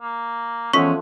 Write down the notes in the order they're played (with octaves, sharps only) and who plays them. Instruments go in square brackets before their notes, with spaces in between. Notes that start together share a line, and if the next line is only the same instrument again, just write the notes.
[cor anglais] A#3
[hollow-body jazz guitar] E2 C#4 [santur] F3 A3 F#5 [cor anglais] G#3 [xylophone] C#6 B6